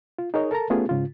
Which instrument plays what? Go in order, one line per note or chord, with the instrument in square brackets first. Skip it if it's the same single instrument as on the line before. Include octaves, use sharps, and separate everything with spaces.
[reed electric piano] F4
D#4 G#4 A#4 C#5 D#5
A4 A#4 A5 A#5
A3 B3 C#4 F4 G4 G#4
G#2 C#3 F4